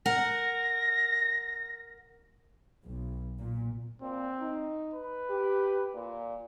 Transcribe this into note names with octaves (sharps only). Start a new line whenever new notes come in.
A#4 F#5 A#6
B1
A#2
A#2 C4
D#4
B4
G4
A#2